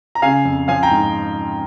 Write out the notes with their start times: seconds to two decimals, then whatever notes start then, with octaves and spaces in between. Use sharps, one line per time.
0.15 A#5
0.22 C#3 F5 G#5
0.45 F2
0.68 F3 F5 G#5
0.83 G5 A#5
0.91 G#2